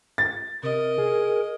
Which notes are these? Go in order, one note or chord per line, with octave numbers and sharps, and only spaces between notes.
A6
C3 A#4 D#5
G#4